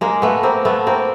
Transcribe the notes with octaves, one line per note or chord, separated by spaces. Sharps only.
G#3 A#3
A3 B3
A#3 C4
A3 B3
A#3 C4